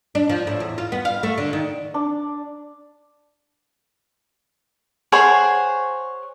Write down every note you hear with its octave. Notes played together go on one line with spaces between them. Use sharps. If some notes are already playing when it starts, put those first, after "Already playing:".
D4
F3
A2
E2
F4
B3
F5
A3
D3
D#3
D4
G#4 C5 C#5 F#5